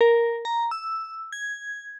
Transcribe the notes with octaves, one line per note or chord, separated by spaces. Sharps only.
A#4
A#5
E6
G#6